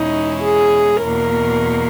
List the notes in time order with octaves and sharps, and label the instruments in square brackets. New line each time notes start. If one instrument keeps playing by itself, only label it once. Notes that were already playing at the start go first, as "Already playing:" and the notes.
Already playing: [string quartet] E2 B2 G#3 C#4 E4 [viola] D#4
[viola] G#4
[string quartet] E2 B2 A#3 [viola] A#4